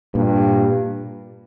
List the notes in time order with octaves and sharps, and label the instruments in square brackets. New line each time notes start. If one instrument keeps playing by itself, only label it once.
[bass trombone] G2 [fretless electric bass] A#2